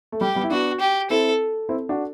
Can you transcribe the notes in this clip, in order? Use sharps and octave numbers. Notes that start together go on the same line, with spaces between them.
A3
G3 G4
G3 B3
E4
B3 D4 F#4
G4
C4 E4 A4
C4 E4
D4 F#4